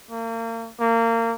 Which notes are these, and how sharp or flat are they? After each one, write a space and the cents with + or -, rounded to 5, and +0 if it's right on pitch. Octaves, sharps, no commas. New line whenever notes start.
A#3 -35
A#3 -25